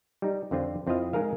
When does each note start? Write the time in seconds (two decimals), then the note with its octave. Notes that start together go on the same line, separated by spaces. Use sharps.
0.22 G3 D#4
0.51 F2 D3 C4 F4
0.87 F2 C4 E4 F4 D#5 F5
1.13 G#3 D#4 G#4 A#4 F5